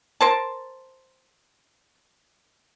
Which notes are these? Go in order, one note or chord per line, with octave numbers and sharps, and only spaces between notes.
A#4 C5 A5